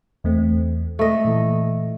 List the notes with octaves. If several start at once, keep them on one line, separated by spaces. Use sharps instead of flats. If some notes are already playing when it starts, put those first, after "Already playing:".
E2 A3 C4
A3 D#5
A#2 E3